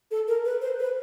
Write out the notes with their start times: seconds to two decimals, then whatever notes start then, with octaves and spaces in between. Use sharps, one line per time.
0.11 A4
0.28 A#4
0.45 B4
0.61 C5
0.79 B4